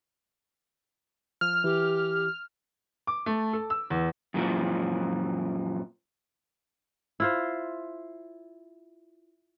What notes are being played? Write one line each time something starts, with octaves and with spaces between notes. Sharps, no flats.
F3 F6
E3 G4
D6
A3
A4
E6
E2
F#2 A#2 E3 F3
E4 F4 C5